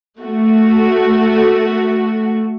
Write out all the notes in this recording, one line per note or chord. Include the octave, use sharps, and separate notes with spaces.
A3 F#4